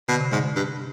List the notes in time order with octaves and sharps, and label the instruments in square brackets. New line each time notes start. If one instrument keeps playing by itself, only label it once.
[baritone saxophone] B2 [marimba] D3
[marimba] C3
[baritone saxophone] G#2 [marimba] D3
[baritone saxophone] G2